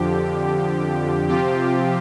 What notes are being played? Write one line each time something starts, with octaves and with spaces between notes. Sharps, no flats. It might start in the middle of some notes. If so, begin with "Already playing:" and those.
Already playing: F2 D3 F3 G4
C3 F3 C4 F4 G4